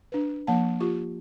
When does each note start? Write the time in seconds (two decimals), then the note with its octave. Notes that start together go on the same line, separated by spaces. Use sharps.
0.12 D4 B4
0.47 F3 A#3 A5
0.80 F4 G4 C#6